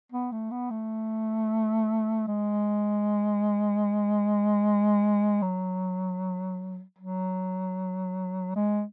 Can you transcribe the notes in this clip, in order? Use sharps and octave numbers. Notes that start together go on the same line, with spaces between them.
B3
A3
B3
A3
G#3
F#3
F#3
G#3